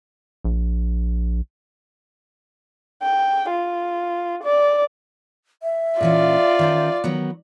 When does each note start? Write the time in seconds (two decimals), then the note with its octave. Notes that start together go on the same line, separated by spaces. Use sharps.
0.44 A#1
3.03 G5
3.50 F4
4.44 D5
5.63 E5
6.01 A#2 E3 C#4 F4 D5
6.59 D#3 C#4 C5
7.04 D#3 F#3 B3